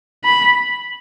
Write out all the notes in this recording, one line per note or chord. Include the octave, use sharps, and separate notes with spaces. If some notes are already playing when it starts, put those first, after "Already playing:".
B5